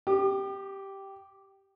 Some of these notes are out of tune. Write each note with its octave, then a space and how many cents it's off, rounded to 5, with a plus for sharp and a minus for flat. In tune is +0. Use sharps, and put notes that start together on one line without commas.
G4 -5 D6 +40